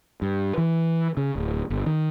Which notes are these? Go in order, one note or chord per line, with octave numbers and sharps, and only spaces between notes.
G2
E3
C#3
D1
G1
D#3